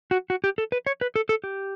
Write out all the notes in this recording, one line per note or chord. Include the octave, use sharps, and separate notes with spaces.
F#4
F#4
G4
A4
B4
C#5
B4
A4
A4
G4